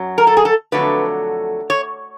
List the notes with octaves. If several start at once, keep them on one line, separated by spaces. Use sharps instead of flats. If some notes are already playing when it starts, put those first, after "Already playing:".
Already playing: F#2 F#3
A#4
A4
G#4
A4
F2 D3 F#3 A3 B4
C#5